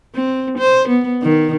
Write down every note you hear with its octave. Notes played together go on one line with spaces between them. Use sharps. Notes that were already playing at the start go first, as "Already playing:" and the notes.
C4
C5
B3
D#3